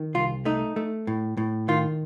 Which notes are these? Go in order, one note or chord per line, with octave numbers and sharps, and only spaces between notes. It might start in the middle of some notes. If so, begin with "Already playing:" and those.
Already playing: D#3
C2 F4
A3 D#4
A3
A2
A2
D#3 F4